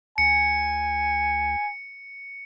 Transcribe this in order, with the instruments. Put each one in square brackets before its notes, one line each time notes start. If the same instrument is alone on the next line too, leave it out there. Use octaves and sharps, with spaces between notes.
[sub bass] D2 [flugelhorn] G#5 [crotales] C#7